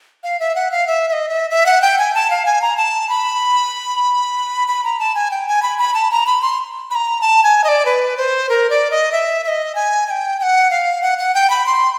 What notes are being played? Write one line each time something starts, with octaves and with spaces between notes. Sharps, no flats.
F5
E5
F#5
F5
E5
E5
D#5
E5
E5
F#5
G5
G#5
A5
F5
G#5
A#5
A5
B5
B5
A#5
A5
G#5
G5
G#5
B5
B5
A5
A#5
B5
C6
B5
A#5
A5
G#5
D#5
D5
B4
C5
A#4
D5
D#5
E5
E5
D#5
G#5
G#5
G5
G5
F#5
F5
F#5
F#5
G5
B5
C6